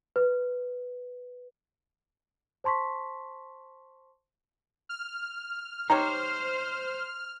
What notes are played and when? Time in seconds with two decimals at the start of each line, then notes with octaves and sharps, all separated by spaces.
0.16 B4
2.64 C5 A5 C6 C#6 B6
4.89 F6
5.90 D#4 G4 C5 C#5 A#5